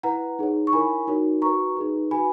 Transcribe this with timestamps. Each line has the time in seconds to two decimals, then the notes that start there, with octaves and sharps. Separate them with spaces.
0.03 E4 B4 F#5 A#5
0.39 D#4 G#4 C#5
0.67 C#6
0.73 E4 A#4 C#5 G#5 B5
1.07 D#4 F#4 A#4 C#5
1.42 F#4 B4 A#5 C#6
1.77 D#4 G#4 B4
2.11 F#4 B4 G#5 B5